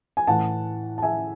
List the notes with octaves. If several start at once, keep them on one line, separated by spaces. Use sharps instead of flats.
G#5
A2 E3 F#5 A5
A5
E5 G#5